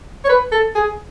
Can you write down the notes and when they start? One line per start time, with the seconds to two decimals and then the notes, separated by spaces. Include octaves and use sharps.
0.25 C#5
0.29 B4
0.52 A4
0.75 G#4